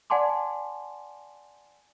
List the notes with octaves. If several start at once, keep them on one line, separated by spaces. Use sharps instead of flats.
D5 F#5 G#5 A5 C6 D6